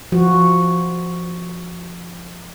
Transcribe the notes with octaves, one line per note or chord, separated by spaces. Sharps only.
F3 F#4